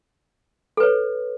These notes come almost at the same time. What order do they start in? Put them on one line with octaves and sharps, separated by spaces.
A4 B4 C#5